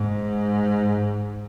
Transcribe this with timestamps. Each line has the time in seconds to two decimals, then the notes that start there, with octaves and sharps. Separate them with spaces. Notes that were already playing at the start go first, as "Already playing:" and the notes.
Already playing: G#2